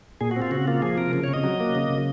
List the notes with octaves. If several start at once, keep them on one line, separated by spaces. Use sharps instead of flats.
A#2 G#4
F#4
C4
F4
C#3 F#4
A#3 F4
F3 G#4
C3 A#4
C#3
C#5
C#3
D#5
F#3
A#3
C#3
C#3